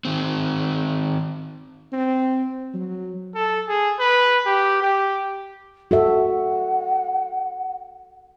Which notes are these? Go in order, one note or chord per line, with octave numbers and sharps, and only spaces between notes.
D#3 C4
C4
F#3
A4
G#4
B4
G4
G4
F#4 A4 E5 F#5